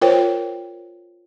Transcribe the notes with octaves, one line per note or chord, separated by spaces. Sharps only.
F4 A#4 C5 C#5 G5